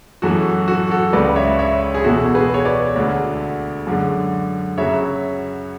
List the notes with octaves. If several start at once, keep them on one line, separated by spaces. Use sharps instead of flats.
F#2 E3 G#3 F#4 A4
F#4 A4
F#4 A4
C#2 C#3 G#3 B4 D5
C#5 E5
C#5 E5
G#4
E2 B2 G#3 F#4 A4
G#4 B4
C#5
B4 D5
D2 D3 G#3
F#2 D3 G#3
F#2 C#3 F#3 C#5 E5